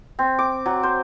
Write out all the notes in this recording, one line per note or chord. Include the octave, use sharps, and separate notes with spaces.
C4
D6
F#3
C5